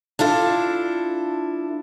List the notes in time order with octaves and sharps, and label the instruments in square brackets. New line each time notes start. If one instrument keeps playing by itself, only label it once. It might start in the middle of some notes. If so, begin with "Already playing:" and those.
[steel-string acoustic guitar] D4 E4 F4 A4